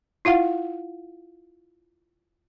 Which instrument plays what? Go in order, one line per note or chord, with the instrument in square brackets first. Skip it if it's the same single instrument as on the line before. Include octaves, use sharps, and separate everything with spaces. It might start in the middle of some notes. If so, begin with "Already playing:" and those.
[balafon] E4 F4 F5 F#5